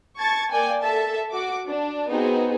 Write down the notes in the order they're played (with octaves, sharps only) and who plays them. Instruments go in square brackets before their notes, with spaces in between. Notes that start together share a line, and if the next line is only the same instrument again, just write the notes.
[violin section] A5 C#6 G#6 A6
A#3 D5 G5 G#5
A4 E5 A5
F#4 D6
D4
B3 C4 D#4 F#4 G#4